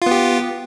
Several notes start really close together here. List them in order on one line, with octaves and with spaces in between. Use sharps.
F4 B3 G4